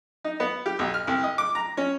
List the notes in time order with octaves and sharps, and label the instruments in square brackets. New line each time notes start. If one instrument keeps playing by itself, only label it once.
[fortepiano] D#4
B3
G4
B1
F6
C2
D#5
D6
A#5
C#4